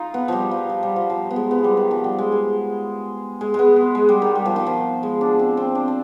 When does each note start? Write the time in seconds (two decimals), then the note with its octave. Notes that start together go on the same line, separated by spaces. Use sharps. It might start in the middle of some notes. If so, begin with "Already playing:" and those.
Already playing: D#4 F4
0.14 B3
0.28 F3 G3
0.51 F3
0.69 F3
0.83 G3
0.96 F3
1.10 F3
1.31 B3
1.36 G#3
1.51 B3
1.64 G3
1.77 D#3
1.91 F3
2.04 G3
2.19 G#3
2.32 G#3
3.41 G#3
3.54 G#3 B3
3.76 B3
3.95 G#3
4.09 G3
4.22 D#3
4.35 G3
4.45 F3
4.56 D#3
4.67 F3
5.03 G#3
5.21 D4
5.39 C4
5.57 C4
5.75 D4
5.88 D4